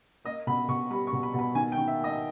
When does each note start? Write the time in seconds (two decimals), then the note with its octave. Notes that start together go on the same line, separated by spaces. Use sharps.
0.25 A#3 D#5
0.47 B2 B5
0.68 B2 C#6
0.90 G3 B5
1.07 C#6
1.13 B2
1.23 B5
1.34 B2
1.39 B5
1.55 D#3 G#5
1.72 G5
1.78 D#3
1.88 E5
1.99 A#3 D#5